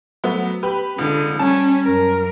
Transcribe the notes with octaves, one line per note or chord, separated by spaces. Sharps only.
F#3 A3 B3
G4 B4 B5
C#2 D3
G3 C#4 A5
F#2 A#4